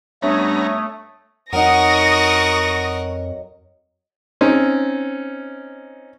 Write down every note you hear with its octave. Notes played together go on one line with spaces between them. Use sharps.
G2 A3 B3 C#4 C#5 E5 A#5 D#6
F2 F#3 D#4 A#4 F#5 C#6 D#6 A#6
C4 C#4 D#4